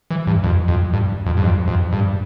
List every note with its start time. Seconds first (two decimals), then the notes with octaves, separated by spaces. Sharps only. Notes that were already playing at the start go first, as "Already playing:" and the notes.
0.11 E3
0.27 G2
0.44 F2
0.68 F2
0.93 G2
1.26 F2
1.37 G2
1.43 F2
1.68 F2
1.92 G2